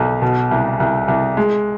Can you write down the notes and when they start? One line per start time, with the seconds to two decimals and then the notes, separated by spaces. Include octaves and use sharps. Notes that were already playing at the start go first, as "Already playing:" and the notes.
Already playing: B1
0.22 B2
0.51 C2
0.80 C2
1.08 C2
1.37 G#3